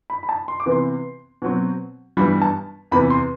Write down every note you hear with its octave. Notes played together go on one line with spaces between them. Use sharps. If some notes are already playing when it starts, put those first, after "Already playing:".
B5
B5
A5
C6
D6
C3 E3 B3
C6
B2 F#3 C4
G2 E3 G3 B3 B5
A5
E2 C3 E3 B5
C6